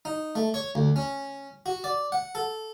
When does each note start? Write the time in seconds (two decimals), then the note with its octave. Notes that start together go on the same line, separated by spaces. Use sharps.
0.05 D#4
0.35 A3
0.54 C#5
0.75 D2
0.96 C#4
1.66 F#4
1.84 D5
2.12 F#5
2.35 A4